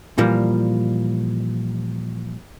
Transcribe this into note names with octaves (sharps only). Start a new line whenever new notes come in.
A#2 E3 F3 G3 A#3